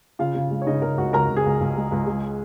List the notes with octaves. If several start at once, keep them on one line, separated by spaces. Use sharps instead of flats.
C#3 F4 F5
C#3
G#3
C#5
C#3 D#4 D#5
C#3 A#4
C#2 F#4 F#5
C#2 A#4 A#5
C#2
G#4 G#5
C#2
C#2
G#3
C#2
G#3